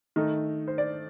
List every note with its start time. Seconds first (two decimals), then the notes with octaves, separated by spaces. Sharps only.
0.16 D#3 A3 D#4
0.68 C5
0.78 D5